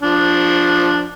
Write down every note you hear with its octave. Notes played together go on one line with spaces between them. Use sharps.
F3 D4